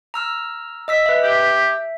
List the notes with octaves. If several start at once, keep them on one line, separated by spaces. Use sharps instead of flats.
A#5 E6 F6
D#5 E6 B6
B4 E5
G4 E5